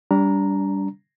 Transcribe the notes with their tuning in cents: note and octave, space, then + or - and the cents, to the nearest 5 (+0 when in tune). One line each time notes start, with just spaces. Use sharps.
G3 +0 D4 -30 A#5 +0